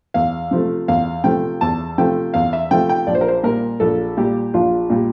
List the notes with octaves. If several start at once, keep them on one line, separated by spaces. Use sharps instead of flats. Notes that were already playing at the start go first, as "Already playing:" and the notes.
E2 F5
C3 F3 A3
E2 F5
C3 F3 A3 G5
E2 A5
C3 F3 A3 G5
E2 F5
E5
C3 F3 A3 G5
G5
A#1 D5
C5
A#4
C5
A#2 G3 A#4
A#1 A4
A#2 G3 G4
A#1 F4
A#2 G3